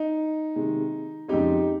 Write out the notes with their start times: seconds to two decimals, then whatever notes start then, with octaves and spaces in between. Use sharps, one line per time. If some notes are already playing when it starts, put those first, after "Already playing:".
Already playing: D#4
0.56 C3 D#3 G#3
1.28 F2 C#3 G#3 C4 D#4 G4